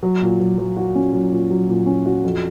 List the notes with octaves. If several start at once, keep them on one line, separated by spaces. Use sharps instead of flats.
F#3
A#2
F#3
F#3
F#4
C#4
F#3
A#2
F#3
A#2
C#4
F#4
F2